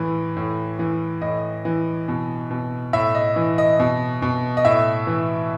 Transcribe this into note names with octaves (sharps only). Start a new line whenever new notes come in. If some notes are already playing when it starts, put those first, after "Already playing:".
Already playing: A2 E3
A2
E3
A2 D#5
E3
B2
B2
A2 E5
D#5
E3
D#5
B2
B2
D#5
A2 E5
E3